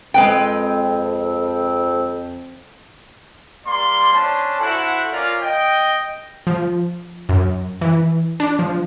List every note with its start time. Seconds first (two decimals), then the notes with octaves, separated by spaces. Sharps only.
0.14 F2 G#3 C4 B4 G5
3.66 G3 A#3 D5 C6
4.12 C#4 D4 C5 A5
4.60 E4 F#4 A4 C5 F#5
5.12 C#4 F4 A#4 D5
5.43 D#5 G5
6.47 F3
7.29 F#2
7.81 E3
8.40 D4
8.59 F3